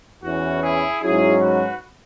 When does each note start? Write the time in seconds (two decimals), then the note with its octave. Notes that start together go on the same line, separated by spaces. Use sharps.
0.24 E2 E3 C#4 F#4
0.62 E4 G#4
1.02 G#2 F#3 C#4 E4 G#4
1.41 F#4 B4